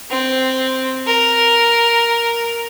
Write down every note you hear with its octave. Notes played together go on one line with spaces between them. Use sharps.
C4
A#4